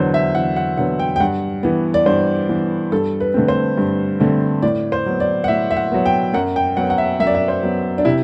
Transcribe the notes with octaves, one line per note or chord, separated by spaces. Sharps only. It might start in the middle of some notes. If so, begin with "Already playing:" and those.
Already playing: E2 D3 F#3 B3 C5
E5
E2 F#5
F#5
D3 F#3 B3 F#5
G5
G5
G2 F#5
E3 B3
D5
G2 C5
E3 B3
G2 A4
B4
D3 A3 C4
C5
G2
D3 A3 C4
A2 D5
C5
F#3 B3
D5
F#5
A2 E5
E5
F#5
F#3 B3
G5
F#2 F#5
G5
F#3 B3 F#5
F#5
E5
F#2 E5
D5
E5
C5
F#3 B3
D4
C3 E4